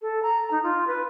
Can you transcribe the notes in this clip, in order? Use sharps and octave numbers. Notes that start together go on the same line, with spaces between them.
A4
A#5
D#4
F4
B4